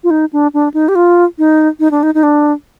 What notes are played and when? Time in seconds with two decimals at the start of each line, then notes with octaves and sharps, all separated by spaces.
0.04 F4
0.11 D#4
0.33 D4
0.54 D4
0.74 D#4
0.88 G4
0.95 F4
1.39 D#4
1.80 D#4
1.91 D4
2.03 D#4
2.15 D#4
2.23 D4